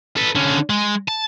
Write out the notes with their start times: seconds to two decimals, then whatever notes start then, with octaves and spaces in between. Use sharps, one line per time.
0.17 A4 B4
0.35 D3 C#4
0.70 G#3
1.08 A5